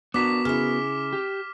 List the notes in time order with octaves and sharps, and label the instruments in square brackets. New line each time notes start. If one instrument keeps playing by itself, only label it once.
[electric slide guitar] B3 F#4 A#4 [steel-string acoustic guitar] D4 [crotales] D6 B6 E7
[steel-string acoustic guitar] C#3 E4 [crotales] F6
[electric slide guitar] G4